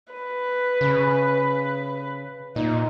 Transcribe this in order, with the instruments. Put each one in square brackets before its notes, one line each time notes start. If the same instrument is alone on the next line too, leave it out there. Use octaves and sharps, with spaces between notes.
[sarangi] B4
[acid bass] C#3
[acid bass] A#2 [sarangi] D#4